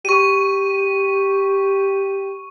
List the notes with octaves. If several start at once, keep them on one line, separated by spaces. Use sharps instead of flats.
G4 C#6 D#7